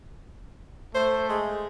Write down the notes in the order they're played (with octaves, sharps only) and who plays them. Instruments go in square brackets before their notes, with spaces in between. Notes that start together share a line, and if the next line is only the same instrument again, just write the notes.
[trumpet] A3 [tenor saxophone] C5
[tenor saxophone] G#3